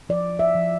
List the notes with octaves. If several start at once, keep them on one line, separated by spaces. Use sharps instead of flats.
F3 D5
E5
F3